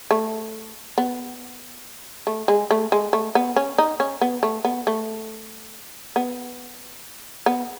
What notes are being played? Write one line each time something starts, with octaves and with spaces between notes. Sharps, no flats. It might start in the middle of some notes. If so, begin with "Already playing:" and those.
A3
B3
A3
G#3
A3
G#3
A3
B3
C#4
D#4
C#4
B3
A3
B3
A3
B3
B3